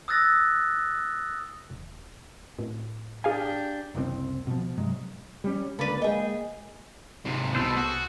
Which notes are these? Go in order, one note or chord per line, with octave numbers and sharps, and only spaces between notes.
D#6 E6 F#6 A6 A#6
D#1
A2
D4 G4 G#4 F5 G#5
F#1 C2 C#3 C4
B2 F3
G2 C3 F#3 G#3
G3 C#4
C#2 D3 A#3 B4 D5 B5
G#3 A#3 G#4 D#5 G5
G#2 C3
C2 B2 G#4 A4 C5
F#4